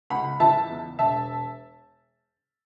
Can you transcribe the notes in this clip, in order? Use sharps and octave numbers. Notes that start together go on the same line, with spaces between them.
C#2 F#5 B5
E3 E5 A5
E2
E1 E5 A5